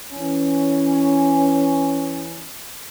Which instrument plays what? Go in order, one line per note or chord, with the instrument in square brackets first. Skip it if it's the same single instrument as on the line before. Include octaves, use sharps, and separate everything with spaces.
[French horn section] E3 C#4